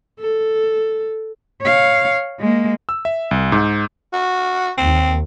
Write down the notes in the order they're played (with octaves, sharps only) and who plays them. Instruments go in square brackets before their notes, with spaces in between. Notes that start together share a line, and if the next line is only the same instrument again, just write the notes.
[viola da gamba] A4
[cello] C#5 F5
G#3 A#3
[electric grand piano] E6
E5
C2
G#2
[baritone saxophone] F#4
[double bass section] D#2 [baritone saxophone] C4